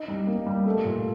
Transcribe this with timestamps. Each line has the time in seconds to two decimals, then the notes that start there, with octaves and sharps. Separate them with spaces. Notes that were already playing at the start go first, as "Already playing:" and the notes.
Already playing: D#4
0.08 G3
0.27 A#3
0.46 G3
0.66 A3
0.85 A#2